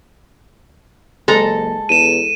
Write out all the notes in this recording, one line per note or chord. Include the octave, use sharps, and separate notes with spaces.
F#1 G#3 A4 A#5
E2 D#7 E7